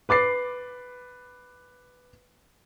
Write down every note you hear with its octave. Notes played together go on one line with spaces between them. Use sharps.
B4 D6 A6 C7